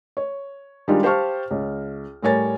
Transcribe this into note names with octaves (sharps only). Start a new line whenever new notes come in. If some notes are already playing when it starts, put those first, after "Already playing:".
C#5
D#3 G3 G#3 D4 F4 G4
G4 C5 F5 A5 C#6 F6
C#2
A2 G3 A#4 C#5 G#5 A6